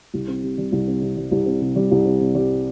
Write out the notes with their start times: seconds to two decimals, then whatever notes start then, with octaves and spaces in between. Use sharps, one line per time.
0.14 C2
0.28 C4
0.43 C3
0.58 G3
0.72 C2
0.88 C4
1.02 C3
1.17 G3
1.31 C2
1.46 C4
1.61 C3
1.76 G3
1.91 C2
2.06 C4
2.20 C3
2.35 G3